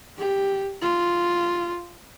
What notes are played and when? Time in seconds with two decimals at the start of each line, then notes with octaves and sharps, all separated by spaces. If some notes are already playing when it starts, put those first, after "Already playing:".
0.17 G4
0.82 F4